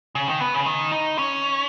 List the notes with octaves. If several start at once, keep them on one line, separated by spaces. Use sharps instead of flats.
C#3
D#3
B3
C#3
D#3
D#4
C#4